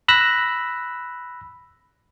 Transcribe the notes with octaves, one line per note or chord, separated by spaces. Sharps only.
B5 E6 F#6 A#6